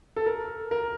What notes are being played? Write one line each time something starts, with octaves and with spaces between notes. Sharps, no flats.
A4
A#4
A#4